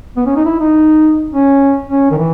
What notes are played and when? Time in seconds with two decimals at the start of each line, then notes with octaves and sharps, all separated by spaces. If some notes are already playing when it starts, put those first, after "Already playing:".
0.17 B3
0.26 C#4
0.36 D#4
0.45 E4
0.60 D#4
1.33 C#4
1.90 C#4
2.11 D#3
2.18 E3